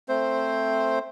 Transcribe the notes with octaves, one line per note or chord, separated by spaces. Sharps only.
A3 C4 C5